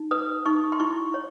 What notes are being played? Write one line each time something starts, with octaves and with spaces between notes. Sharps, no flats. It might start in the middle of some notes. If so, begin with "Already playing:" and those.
Already playing: D#4
B4 D#6
D#4 C#6
C6
E4 C#6
C#5